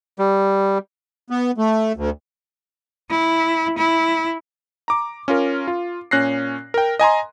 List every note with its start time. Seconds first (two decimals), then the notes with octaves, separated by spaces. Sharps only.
0.19 G3
1.30 B3
1.58 A3
1.96 D2
3.10 E4
3.77 E4
4.88 A#5 D6
5.28 C#4 F4 A#4
5.68 F4
6.11 A#2 C#4 F#6 A#6 C7
6.74 A#4 G5
6.99 D#5 G#5 A#5 C6